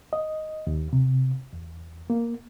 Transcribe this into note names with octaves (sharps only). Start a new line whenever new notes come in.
D#5
D#2
C3
E2
A#3